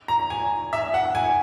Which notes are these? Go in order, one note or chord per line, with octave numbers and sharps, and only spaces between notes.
A#5
G#5
E5
F#5
G#5